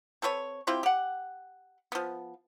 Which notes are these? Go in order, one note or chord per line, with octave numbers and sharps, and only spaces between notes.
C4 A4 B4 C#5
C4 E4 F4 G4
G4 F#5
F3 B3